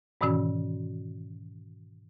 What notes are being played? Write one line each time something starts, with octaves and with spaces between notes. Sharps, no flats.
G#2 B2 D#3 E3 C#4 F#4